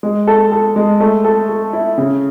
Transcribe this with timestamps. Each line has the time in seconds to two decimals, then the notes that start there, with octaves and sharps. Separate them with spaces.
0.03 G#3
0.27 A4
0.52 A4
0.76 G#3
1.00 A3
1.24 A4
1.49 A4
1.73 E4
1.98 C#3